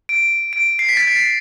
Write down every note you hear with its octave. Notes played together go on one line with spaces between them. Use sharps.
D7
D7
C7
B6
A6
B6